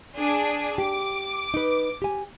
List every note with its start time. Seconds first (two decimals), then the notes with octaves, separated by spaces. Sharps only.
0.16 D4 G#4 G#5
0.78 G4 D6
1.54 D#4 B4
2.02 G4 G#5